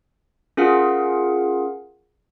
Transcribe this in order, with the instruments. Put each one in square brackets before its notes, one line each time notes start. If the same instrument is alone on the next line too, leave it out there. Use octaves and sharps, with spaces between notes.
[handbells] C#4 F4 G#4 A#4 F5 F#5